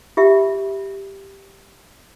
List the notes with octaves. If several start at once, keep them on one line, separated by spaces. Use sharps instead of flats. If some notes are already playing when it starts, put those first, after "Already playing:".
F4 G4 E5